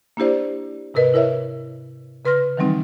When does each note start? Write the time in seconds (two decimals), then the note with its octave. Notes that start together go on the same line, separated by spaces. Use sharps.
0.17 A#3 D4 E4 G4 C5 D5
0.94 G#2 C3 A#4 B4 D#5
1.14 E4 A#4 C#5 E5
2.25 C#3 B4 C6 F6 A#6
2.57 D#3 E3 F#3 G3 C4 D#4